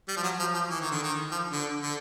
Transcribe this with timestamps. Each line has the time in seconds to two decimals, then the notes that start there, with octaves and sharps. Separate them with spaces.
0.08 G3
0.17 F3
0.23 F#3
0.39 F3
0.54 F3
0.70 E3
0.81 D#3
0.91 D3
1.03 D#3
1.31 F3
1.51 D3
1.83 D3